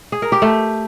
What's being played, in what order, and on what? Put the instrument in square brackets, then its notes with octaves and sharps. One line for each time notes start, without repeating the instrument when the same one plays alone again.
[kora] G#4
A#4
G4
A3